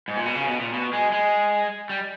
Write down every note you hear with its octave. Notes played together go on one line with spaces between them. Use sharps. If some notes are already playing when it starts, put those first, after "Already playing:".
G#2
A#2
B2
C#3
B2
A#2
B2
G#3
G#3
G3